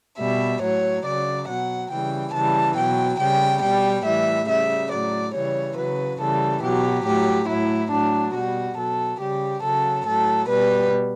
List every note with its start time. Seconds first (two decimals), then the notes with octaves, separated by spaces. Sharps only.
0.19 B2 G3 E5
0.62 A2 F#3 C#5
1.05 C#3 F#3 D5
1.48 B2 F#3 F#5
1.90 C#3 E3 G3 G5
2.33 C#3 E3 G3 A5
2.76 B2 F#3 G5
3.20 C#3 G3 G5
3.62 B2 G3 G5
4.05 A2 E3 G3 E5
4.48 C#3 G3 E5
4.91 A2 F#3 D5
5.34 C#3 E3 G3 C#5
5.77 C#3 F#3 B4
6.20 C#3 E3 G3 A4
6.62 B2 F#3 G4
7.05 A2 F#3 G4
7.48 A2 F#3 E4
7.91 A2 F#3 D4
8.34 B2 G3 F#4
8.77 B2 F#3 A4
9.20 C#3 G3 G4
9.63 C#3 F#3 A4
10.06 A2 F#3 A4
10.49 B2 G3 B4